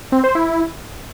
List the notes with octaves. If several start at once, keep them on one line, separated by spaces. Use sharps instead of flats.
C4
C5
E4